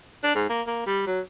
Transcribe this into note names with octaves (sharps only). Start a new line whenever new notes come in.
D4
G#2
A#3
A#3
G3
F#3